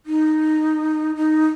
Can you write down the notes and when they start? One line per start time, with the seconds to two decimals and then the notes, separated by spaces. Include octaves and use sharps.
0.06 D#4
1.15 D#4